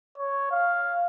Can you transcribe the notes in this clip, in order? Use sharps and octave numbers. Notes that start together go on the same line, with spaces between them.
C#5
F5